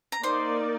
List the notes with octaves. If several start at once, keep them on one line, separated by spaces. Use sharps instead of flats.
A#5
A#3 D#4 A#4 C5 D5 C6